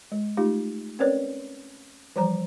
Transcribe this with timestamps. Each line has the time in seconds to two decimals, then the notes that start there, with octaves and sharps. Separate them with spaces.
0.12 G#3
0.37 A3 D#4 F4 G4
0.99 C4 C#4 A#4 B4 C#5 D5
2.16 E3 F3 G3 C5 A#5